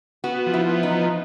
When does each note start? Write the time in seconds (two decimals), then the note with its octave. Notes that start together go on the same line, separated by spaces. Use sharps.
0.24 B3 F#4
0.46 F3
0.54 E4
0.69 B3
0.83 D#4
0.91 F3